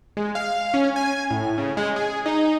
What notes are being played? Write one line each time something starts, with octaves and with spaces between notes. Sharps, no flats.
G#3
F5
C#4
G#5
A2
C#3
G#3
G#4
D#4